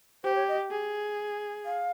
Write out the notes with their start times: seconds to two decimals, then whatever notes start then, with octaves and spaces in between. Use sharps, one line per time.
0.24 G4 C5
0.36 C#5
0.48 D#5
0.71 G#4
1.65 F5